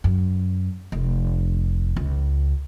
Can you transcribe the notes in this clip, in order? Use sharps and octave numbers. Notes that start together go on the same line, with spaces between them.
F#2
F1
C#2